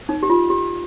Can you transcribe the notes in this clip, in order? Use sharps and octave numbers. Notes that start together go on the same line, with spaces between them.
D#4
G4
F4
G4